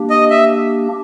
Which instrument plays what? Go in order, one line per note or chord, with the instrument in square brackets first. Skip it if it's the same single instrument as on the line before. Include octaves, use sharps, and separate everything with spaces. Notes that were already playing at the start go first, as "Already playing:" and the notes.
Already playing: [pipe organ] A#3 D4 G4
[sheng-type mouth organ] D#5
E5